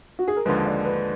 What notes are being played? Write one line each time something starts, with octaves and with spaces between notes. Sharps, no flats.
F#4
G#4
A#4
D#2 D3 F3 G#3 B4
D5
B4